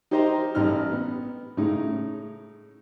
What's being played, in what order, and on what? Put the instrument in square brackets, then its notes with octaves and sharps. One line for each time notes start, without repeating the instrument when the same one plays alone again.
[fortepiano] D#4 G4 A#4 C5 D#5 A#5
A1 G3 D#4 F6
B3
A2 C#3 D#4